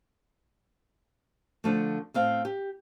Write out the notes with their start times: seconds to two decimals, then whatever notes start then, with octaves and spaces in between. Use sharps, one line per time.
1.64 D3 F3 A3
2.14 A2 C4 F5
2.45 G4